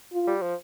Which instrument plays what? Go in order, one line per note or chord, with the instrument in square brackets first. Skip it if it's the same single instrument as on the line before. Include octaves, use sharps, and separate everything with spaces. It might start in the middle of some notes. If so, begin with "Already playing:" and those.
[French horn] F4
[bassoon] G3
F3